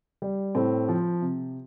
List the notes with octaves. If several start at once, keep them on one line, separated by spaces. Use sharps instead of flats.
G3
A2 C4
F3
C3